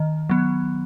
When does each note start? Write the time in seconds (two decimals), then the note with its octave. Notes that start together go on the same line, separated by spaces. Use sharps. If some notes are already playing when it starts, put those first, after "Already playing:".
Already playing: D#3
0.30 F#3 B3